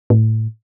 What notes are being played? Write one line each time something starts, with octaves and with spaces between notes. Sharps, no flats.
A2